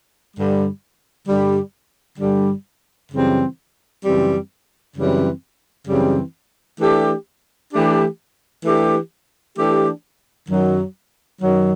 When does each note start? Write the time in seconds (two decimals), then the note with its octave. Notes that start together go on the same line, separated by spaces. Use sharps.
0.35 G2 D3 G3
1.27 G2 D3 G3
2.19 G2 D3 G3
3.11 F#2 C#3 E3 G3 C4
4.04 F#2 C#3 E3 G3 C4
4.96 F#2 C#3 E3 G3 C4
5.88 F#2 C#3 E3 G3 C4
6.81 E3 A3 D4 G4
7.73 E3 A3 D4 G4
8.65 E3 A3 D4 G4
9.57 E3 A3 D4 G4
10.49 F#2 D#3 F#3
11.41 F#2 D#3 F#3